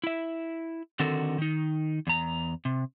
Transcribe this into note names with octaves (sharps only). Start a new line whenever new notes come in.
E4 E5
D3 D#3 C4 F#4 A4 A#4
D#3 D#4
E2 A#5
C3